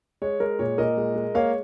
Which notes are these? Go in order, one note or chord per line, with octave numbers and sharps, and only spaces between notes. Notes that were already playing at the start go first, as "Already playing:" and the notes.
G#3 C#5
G#3 A#4
A#2 C#5
A#2 A#4 D#5
G#3
G#3
A#3 C#5 F5